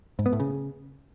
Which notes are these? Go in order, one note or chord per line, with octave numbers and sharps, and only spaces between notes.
G#2
B3
A2
C#3